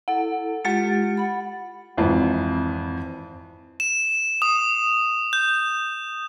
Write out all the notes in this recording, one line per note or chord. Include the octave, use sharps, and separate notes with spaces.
E4 A4 F#5
G#3 F4 G4 F#5 A6 C#7
F#5 B5
G#1 F2 E3
E7
D#6
G6